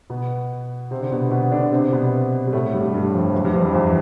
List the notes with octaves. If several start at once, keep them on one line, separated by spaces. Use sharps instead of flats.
B2 B3
C3 C4
D3 D4
B2 B3
B2 B3
D3 D4
C3 C4
B2 B3
G3
A2 A3
G2 G3
G2 G3
F2 F3
E2 E3
G2 G3
F2 F3
F2 F3
E2 E3